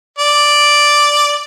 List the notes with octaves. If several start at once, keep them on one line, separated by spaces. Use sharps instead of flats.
D5